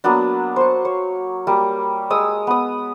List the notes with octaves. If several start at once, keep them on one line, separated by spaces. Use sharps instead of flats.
F#3 A#3 B3 D4
C5 C#6
C#5
G3 A#3
G#3 D#6 E6
B3 D#6